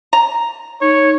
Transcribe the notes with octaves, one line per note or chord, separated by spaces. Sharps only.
A#5
D#4 C#5